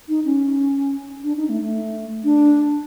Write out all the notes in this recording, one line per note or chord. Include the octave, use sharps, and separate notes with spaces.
D#4
C#4
D4
D#4
A3
A3
D4